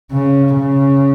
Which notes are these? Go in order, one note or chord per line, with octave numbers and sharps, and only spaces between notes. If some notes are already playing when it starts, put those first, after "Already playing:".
C#3
C#3